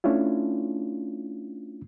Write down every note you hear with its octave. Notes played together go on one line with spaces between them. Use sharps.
A3 C#4 D4 E4 F4